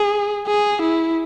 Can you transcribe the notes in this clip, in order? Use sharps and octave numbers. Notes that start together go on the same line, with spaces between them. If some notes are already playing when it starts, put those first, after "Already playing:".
Already playing: G#4
G#4
E4